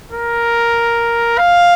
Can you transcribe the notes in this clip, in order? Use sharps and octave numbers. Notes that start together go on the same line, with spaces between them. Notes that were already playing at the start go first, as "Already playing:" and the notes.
A#4
F5